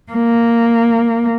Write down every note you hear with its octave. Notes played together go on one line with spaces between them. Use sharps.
A#3